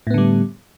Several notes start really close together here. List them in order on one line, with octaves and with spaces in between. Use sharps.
A2 B3 D3 G3